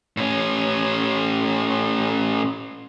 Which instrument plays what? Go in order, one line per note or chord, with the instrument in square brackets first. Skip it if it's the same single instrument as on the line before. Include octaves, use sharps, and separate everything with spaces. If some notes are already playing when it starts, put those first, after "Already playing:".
[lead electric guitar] A2 C#4